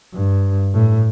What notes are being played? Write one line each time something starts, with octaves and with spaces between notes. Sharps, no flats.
G2
A2